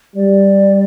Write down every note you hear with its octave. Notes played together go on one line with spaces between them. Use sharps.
G3 D5